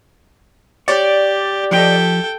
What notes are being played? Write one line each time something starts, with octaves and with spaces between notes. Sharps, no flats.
G4 C#5 D5
F3 G4 A4 D#5 G5